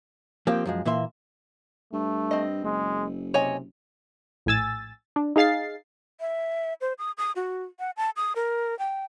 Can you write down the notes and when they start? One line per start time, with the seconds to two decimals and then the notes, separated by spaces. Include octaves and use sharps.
0.47 F3 A#3 C4 G4
0.66 F#2 F3 G#3
0.85 A#2 E3 A#3 E5 C6
1.93 G2 A3
2.31 C4 D#5
2.64 F#1 G#3
3.34 C3 C#5 D#5 G#5
4.46 A#1 A2 G#5 E6 A6
5.16 D4
5.36 D#4 G#4 F5 A6 C7
6.20 E5
6.81 C5
6.99 D#6
7.18 D#6
7.36 F#4
7.80 F#5
7.97 A5
8.16 D#6
8.36 A#4
8.79 G5